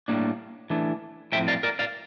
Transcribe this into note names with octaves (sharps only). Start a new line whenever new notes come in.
A2 G3 A#3 D4
E3 A3 D4
A2 F3 C4 E5 G5
D5 F5
A#4 D5
D5 F5